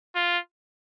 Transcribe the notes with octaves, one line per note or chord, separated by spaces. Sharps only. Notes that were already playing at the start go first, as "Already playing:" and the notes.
F4